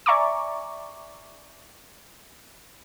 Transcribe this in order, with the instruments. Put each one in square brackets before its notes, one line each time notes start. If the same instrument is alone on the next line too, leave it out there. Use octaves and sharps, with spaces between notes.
[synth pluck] D5 E5 G#5 A#5 C#6 D6